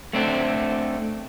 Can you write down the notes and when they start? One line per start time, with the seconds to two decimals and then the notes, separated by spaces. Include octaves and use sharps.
0.13 A3 C4 D4